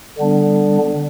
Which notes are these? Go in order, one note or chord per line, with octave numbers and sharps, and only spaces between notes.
D3 G3 B3 D4